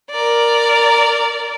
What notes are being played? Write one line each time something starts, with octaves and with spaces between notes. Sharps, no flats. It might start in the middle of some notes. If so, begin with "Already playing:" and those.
A#4 D5